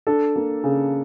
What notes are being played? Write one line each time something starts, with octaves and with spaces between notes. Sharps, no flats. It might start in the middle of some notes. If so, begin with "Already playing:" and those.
D4 A4
A#3
C#3